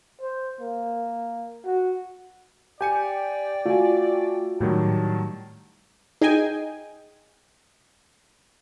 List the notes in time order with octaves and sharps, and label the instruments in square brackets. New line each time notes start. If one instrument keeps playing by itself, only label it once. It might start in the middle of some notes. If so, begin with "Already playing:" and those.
[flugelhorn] C5
A#3
F#4
[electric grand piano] G4 G#5 C#7 [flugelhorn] D5 [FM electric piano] G5
[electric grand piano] A3 G#5 [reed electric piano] F4 F#4
[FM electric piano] A2 [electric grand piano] D#3 F#3 G3 [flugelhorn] A5
[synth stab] D#4 G#4 D#5 G5 G#5